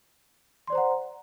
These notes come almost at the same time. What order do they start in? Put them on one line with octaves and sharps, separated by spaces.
C6 D5 C5 A#5 F#5